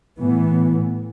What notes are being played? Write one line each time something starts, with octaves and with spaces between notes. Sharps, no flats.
A2 E3 B3